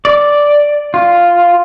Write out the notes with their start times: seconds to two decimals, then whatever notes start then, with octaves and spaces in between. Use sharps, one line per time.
0.05 D5
0.94 F4